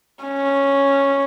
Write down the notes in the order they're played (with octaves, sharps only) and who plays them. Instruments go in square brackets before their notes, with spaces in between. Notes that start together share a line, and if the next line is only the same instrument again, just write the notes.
[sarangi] C#4